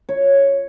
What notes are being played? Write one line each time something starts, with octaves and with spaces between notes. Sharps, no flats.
C#5